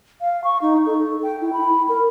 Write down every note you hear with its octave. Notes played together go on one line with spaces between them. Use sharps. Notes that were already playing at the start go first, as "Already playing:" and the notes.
F5
C#6
D#4
A4
G5
E4
B5
A#4